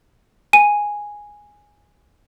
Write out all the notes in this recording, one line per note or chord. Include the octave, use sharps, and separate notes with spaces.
G#5 D#7